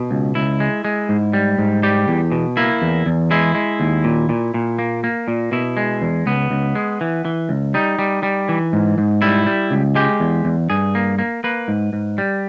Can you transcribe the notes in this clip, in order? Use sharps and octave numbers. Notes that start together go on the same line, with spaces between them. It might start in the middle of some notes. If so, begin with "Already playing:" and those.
Already playing: B2
C#2
C#2 E4
G#3
G#3
G#2
G3
G#2
G3 G4
E2
B2
A#3 E4
E2
E2
G#3 E4
G#3
D#2
A#2
A#2
A#2
A#3
A#3
A#2
B2 E4
G#3
E2
C#2 B3
C#2
G#3
E3
E3
C#2
G3 D#4
G3
G3
E3
G#2
G#2
G3 E4
G3
C#2
G#3 G4
E2
E2
G2 G#4
A#3
A#3
A#3 B4
G#2
G#2
G3